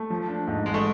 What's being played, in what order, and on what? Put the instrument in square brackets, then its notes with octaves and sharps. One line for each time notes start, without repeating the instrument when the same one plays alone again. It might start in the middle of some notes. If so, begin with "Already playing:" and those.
Already playing: [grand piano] A3
F3
D4
G#2
[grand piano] A1 [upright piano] G#3
[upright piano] A3